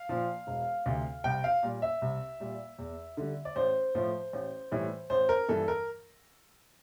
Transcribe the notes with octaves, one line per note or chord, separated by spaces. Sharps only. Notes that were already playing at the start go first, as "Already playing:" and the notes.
Already playing: F5
A#2 F3
E1
D2 C3
C2 G5
F5
A#2 G3
E5
C2
A#2 G3
E2
D3 G3
D5
A1 C5
A2 F3
A1
A2 E3 G3
A1 C5
A#4
G2 E3 G3 A4
A#4